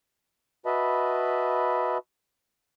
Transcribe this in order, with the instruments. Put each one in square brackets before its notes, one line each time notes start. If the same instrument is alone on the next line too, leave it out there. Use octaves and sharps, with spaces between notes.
[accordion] F#4 B4 D#5 E5 A5 B5